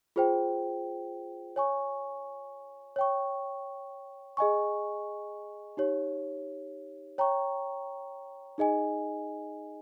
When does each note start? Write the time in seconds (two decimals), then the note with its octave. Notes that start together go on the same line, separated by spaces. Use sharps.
0.16 F4 G#4 C5 G5
1.56 C#5 G#5 C#6
2.96 C#5 G5 C#6
4.37 G#4 D#5 G#5 C#6
5.77 D#4 G4 C#5
7.18 C#5 G5 A#5 C#6
8.58 D#4 G#4 D#5 G#5